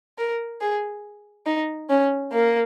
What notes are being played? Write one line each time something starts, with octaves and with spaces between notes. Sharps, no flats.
A#4
G#4
D#4
C#4
A#3